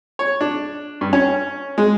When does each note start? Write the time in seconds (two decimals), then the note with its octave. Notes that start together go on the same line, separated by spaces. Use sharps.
0.19 C#5
0.41 D4
1.01 G2
1.13 C#4
1.78 G#3